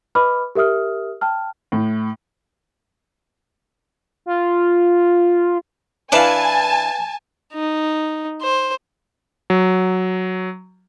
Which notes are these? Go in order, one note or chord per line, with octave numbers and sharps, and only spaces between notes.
B4 D#5 B5 D6 F6
G4 A#4 E5 D#6 F6
G5 A5 F6
A2
F4
E3 D4 E4 B4 F5 G#5 A5
D#4
C5
F#3